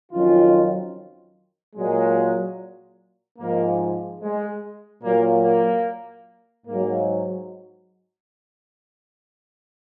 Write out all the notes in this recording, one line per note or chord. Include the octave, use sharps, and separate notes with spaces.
F2 D#3 F#3 C#4 F4
A#2 F#3 G#3
G#2 F3 A#3
G#3
A#2 F#3 A#3
A#3
G#2 F#3 A#3